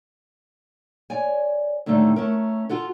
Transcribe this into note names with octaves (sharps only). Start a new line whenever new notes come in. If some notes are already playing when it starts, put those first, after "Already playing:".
C#5 D5 G#5
A2 D3 D#3 G3 A3
A3 C#4 A#4
F4 F#4 A4